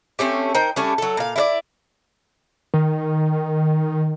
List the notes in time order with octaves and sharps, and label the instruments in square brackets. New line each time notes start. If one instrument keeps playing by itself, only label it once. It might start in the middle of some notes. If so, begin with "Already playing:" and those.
[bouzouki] A3 C4 C#4 G4
D#4 A#4 C5 G5
G3 A3 C#4 D4
F#3 A4
A#2 F5
E4 A4 D5
[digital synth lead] D#3